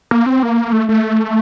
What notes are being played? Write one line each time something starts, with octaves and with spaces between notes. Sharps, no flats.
A#3
C4
A#3
A3
A3